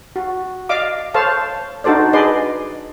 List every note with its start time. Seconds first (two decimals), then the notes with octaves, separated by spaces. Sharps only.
0.16 F#4
0.69 D5 D#5 F5 D6
1.14 A4 C5 C#5 F5 A5
1.84 D4 D#4 F#4 A4 C5 D5
2.13 G#4 B4 D5 D#5 C6